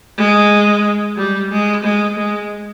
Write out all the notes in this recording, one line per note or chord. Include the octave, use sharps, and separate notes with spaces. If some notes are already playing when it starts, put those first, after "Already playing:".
G#3
G3
G#3
G#3
G#3